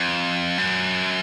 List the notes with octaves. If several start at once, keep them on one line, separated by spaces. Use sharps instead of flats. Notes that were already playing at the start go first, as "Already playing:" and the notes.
Already playing: F2
F#2